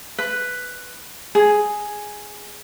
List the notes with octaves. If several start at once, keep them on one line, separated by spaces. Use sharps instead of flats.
B4
G#4